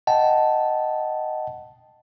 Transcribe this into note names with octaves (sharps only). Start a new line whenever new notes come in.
D#5 F#5 G5 A5